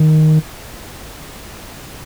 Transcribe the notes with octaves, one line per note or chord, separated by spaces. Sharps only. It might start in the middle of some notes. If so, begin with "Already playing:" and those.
Already playing: D#3